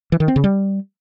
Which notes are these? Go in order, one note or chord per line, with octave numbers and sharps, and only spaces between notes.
E3
D#3
C4
C#3
G3